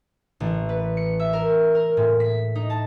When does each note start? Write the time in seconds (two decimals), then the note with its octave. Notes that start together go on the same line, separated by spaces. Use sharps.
0.40 A1
0.69 B4
0.97 C#7
1.20 E5
1.33 A#4
1.75 A#4
1.97 A2
2.20 B6
2.55 D#4
2.70 A5